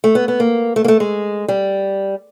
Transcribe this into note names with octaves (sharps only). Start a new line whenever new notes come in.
A3
B3
B3
A#3
A3
A#3
A3
G#3
G3